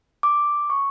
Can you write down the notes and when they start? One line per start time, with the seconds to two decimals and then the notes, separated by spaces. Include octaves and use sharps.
0.23 D6
0.70 C#6